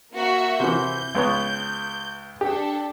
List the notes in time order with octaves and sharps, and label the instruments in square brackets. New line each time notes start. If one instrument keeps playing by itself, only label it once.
[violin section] A#3 F#4 E5
[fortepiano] C3 E3 [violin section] G6
[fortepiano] C#2 B3 C#5
[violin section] D4 A4 [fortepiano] G4